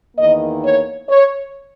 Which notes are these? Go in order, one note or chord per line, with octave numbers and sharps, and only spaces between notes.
E2 D#3 A#3 D#5
C#5
C#5